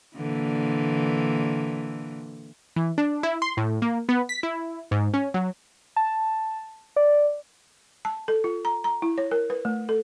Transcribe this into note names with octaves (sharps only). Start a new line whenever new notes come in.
A#2 D3 E3
E3
D4
E4
C6
A2
A#3
B3
B6
E4
G#2
C#4
F#3
A5
D5
A5
A4
F4
A#5
A#5
E4
C#5
A#4
B4
A3
A4